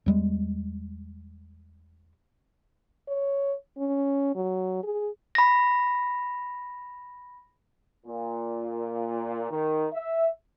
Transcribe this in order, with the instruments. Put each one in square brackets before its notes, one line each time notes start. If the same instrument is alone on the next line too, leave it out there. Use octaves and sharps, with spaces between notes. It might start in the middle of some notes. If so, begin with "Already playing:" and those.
[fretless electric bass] E2 G3 G#3
[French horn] C#5
C#4
F#3
G#4
[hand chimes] B5 A#6
[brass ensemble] A#2
D#3
E5